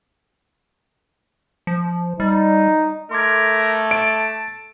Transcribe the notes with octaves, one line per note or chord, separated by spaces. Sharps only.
F3
G3 D#4
A3 A#4 C6 D6 G#6
A5 D7